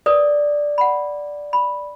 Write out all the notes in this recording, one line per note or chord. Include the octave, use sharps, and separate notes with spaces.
A#4 B4 D5 D#6
F#5 B5
B5